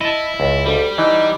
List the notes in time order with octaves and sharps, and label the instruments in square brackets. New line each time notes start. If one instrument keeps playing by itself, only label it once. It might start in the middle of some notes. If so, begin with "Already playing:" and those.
[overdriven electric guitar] E4 [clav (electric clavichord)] D#5 A5
[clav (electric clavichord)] C#2
[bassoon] D2 [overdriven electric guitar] G3
[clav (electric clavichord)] E3 [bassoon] D#4